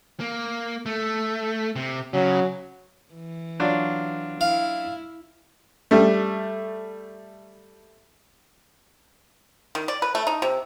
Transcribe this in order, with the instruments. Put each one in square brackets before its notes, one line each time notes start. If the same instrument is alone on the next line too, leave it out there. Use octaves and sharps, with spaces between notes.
[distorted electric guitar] A#3
A3
C3
[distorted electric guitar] C#3 [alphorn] F#3
[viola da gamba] E3
[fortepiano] F#3 D4 F4
[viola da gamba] E4 [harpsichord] F5
[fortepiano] G3 A3
[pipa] D#3
D5
B4
A3
D#4
C3